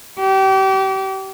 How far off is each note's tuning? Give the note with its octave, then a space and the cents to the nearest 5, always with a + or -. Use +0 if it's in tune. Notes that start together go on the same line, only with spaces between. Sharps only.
G4 -30